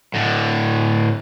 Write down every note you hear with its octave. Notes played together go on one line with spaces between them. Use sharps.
A2 D3